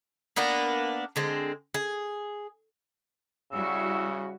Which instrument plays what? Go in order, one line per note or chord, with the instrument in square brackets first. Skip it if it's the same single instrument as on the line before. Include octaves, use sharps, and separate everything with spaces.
[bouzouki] A#3 B3 D4 A#4
D3 G#3 C4
G#4
[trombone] C#3 [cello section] G3 E4 F#4 [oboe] E6